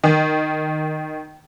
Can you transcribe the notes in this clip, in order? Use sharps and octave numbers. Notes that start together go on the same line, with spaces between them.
D#3